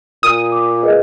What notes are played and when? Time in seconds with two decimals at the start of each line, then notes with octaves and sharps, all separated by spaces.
0.23 A#2 D#6
0.52 D6
0.83 G#4 B4 D#5